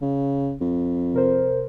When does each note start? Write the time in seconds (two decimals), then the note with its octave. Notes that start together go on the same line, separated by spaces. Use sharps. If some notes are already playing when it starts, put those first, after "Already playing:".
0.02 C#3
0.61 F2
1.14 C3 A#4 C5